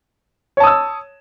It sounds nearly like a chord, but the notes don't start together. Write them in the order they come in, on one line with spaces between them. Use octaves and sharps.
C#5 A5 D#6 E6